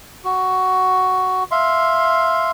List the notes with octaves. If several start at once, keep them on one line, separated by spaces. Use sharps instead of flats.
F#4
E5 F5 C6